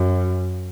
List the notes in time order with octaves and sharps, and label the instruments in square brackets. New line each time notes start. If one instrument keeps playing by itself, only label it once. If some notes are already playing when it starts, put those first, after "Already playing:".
Already playing: [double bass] F#2